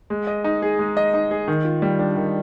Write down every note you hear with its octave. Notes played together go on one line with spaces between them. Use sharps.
G#3
D#5
D#4
G#4
G#3
D#5
D#4
G#4
D#3
F4
G3
D4
D#3